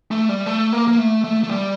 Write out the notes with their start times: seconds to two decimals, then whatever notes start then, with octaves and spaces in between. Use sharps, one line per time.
0.11 A3
0.29 G3
0.46 A3
0.73 A#3
0.88 A#3
0.99 A3
1.24 A3
1.44 A3
1.51 G3